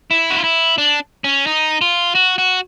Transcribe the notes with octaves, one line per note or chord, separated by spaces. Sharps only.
E4
F#4
F4
E4
D4
C#4
D#4
F4
F#4
F#4